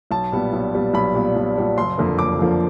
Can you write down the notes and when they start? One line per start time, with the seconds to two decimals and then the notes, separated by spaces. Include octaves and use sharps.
0.11 B1 A5
0.32 A#2 G3 B3
0.53 B1
0.74 A#2 G3 B3
0.94 B1 B5
1.14 A#2 G3 B3
1.36 B1
1.56 A#2 G3 B3
1.77 F#1 C6
1.98 F2 D3 F3 A#3
2.19 F#1 D6
2.39 F2 D3 F3 A#3